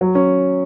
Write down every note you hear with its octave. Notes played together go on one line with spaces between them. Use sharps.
F#3
C#4